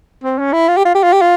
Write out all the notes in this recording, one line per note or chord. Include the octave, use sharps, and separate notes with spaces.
C4
C#4
E4
F4
G4
F4
G4
F4
G4
F4